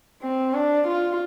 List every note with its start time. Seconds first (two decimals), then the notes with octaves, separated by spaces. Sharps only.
0.22 C4
0.54 D4
0.88 F4